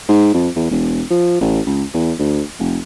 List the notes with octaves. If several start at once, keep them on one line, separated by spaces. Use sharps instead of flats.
G#2
F2
E2
E1
F3
A1
C#2
E2
D2
F1